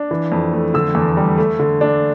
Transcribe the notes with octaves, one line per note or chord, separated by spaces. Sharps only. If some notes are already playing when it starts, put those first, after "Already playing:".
Already playing: D4
E3
F2
A3
D3 E6
E2
G3
A3
D3
D4